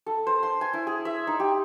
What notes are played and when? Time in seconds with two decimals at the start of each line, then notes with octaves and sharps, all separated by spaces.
0.06 A4
0.27 C5
0.43 C6
0.61 G#5
0.73 E4
0.87 G#4
1.05 E5
1.27 D#4
1.40 G4